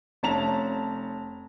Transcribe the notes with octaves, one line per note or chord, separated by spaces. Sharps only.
F1 C#4 A5 A#5 F7